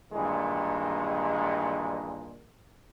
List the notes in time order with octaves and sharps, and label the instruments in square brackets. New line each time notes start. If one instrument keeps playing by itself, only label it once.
[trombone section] G2 A#2 D#3 E3 G#3